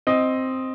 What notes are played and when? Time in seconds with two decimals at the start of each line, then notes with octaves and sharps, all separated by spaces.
0.07 C4 D#5